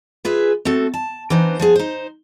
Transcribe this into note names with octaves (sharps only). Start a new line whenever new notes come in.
F4 G#4 B4 E5
A3 C4 F#4 A4
A5
E3 B3 D4 D#4 C5
F3 B3 G#4
D#4 C5